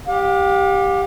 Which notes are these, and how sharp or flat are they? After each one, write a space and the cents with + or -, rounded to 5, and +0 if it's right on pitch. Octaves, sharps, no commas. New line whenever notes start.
G4 +5 F5 +45